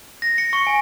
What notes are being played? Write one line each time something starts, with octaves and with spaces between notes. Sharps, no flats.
A#6
C#7
C#6
G#5